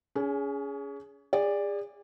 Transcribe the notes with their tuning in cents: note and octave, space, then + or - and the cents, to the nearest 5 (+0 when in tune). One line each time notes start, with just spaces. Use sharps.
C#4 +30 G#4 +0
G#4 -35 D5 +0